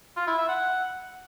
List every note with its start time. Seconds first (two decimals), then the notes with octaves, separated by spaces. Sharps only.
0.17 F4
0.27 E4
0.38 E5
0.48 F#5